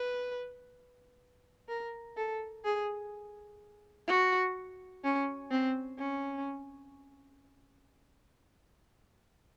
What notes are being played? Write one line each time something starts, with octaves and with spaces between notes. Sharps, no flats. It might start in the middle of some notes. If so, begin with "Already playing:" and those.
Already playing: B4
A#4
A4
G#4
F#4
C#4
C4
C#4